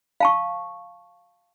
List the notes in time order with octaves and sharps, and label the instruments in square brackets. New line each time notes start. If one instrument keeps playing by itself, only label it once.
[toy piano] F5 A5 C#6